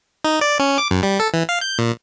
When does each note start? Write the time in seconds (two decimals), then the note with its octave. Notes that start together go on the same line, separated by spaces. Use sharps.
0.25 D#4
0.41 D5
0.59 C#4
0.78 D6
0.91 F#2
1.03 G3
1.20 A4
1.34 E3
1.49 F5
1.61 G6
1.79 A#2